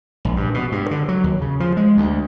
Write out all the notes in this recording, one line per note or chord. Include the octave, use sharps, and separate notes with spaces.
A#1
G2
B2
G2
D3
F#3
D#2
C#3
F3
G#3
D2